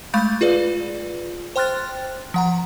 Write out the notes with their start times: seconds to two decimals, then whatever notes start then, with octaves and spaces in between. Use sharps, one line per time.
0.14 G#3 A3 F5 B5 G6 A6
0.41 F4 G#4 B4 D5
1.56 C5 G5 C6 F6 F#6 A6
2.34 F3 F#5 A#5